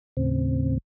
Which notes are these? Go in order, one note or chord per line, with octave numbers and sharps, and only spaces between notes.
D#2 A2 C#3 C4